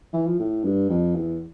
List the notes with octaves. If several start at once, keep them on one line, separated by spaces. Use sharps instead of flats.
E3
F3
A2
G2
F2
E2